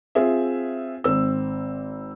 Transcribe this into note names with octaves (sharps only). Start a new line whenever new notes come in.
C4 F4 G#4 E5
G#1 C4 E6